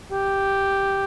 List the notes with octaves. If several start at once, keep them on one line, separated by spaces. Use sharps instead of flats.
G4